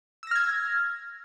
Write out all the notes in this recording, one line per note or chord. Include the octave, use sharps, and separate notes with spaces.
E6 F6 G#6 A#6